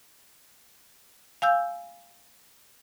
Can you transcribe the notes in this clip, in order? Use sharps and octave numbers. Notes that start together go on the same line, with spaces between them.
F5 G#5 E6 G6